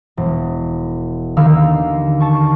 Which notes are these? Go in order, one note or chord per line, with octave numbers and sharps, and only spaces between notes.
E1
D#2 D3 D#3 F5 E6
A5 C#6